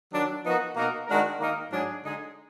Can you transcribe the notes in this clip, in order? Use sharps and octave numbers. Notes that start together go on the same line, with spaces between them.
D#3 F#3 D4
F3 B3 D#4 F#4 A#4
B2 A#3 D#4 F#4 A#4
D#3 G#3 D4 F#4 A#4
D#3 A#3 D#4 A#4
G#2 F#3 D4 G#4
D3 G#3 D#4 G#4